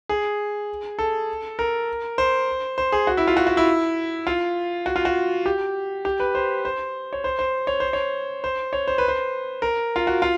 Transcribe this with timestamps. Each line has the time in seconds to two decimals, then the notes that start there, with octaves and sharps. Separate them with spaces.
0.09 G#4
0.99 A4
1.59 A#4
2.18 C5
2.78 C5
2.92 G#4
3.07 F#4
3.17 E4
3.27 F4
3.37 F#4
3.47 F#4
3.57 E4
4.27 F4
4.86 F#4
4.96 F4
5.05 F#4
5.46 G4
6.05 G4
6.20 B4
6.35 C5
6.65 C5
7.13 C#5
7.24 C5
7.39 C5
7.67 C#5
7.80 C5
7.93 C#5
8.44 C5
8.73 C#5
8.88 C5
8.98 B4
9.08 C5
9.62 A#4
9.96 F4
10.07 F#4
10.22 F4